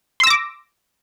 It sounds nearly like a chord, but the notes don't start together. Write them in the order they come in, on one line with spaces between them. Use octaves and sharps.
C6 E6 A#6 D6